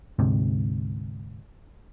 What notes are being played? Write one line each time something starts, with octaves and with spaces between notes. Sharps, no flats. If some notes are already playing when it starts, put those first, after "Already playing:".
D2 G#2 C3